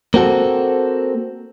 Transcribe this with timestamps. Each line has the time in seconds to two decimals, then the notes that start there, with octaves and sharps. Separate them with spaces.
0.14 A#3 C4 F#4 A4